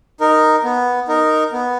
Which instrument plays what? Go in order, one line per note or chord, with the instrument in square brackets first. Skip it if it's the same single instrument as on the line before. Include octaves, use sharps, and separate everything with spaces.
[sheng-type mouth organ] D#4 A#4
B3
D#4 A#4
B3